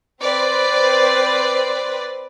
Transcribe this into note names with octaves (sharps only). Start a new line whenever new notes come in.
C4 B4 C5 D5